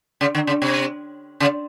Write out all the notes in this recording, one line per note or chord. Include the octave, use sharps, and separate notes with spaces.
C#3
D3
C#3
C3
C#3